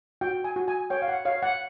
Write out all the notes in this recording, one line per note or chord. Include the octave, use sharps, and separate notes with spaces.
F#4 G5
G#5
F#4
G#5
C#5 G5
F5
F#5
C#5 F5
F#5